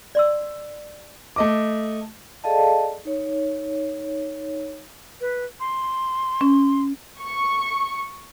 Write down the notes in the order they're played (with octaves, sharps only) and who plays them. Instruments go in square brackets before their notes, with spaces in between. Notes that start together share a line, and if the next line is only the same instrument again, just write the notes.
[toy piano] D5 C6 E6
[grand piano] A3 D#5 D6
[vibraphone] G#4 A4 D5 D#5 F5 A5
D#4 C#5
[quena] B4
C6
[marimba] C#4
[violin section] C#6